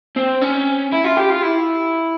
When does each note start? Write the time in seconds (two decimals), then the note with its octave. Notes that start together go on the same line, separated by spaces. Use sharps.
0.16 C4
0.42 C#4
0.93 E4
1.04 F4
1.17 G4
1.30 F4
1.42 E4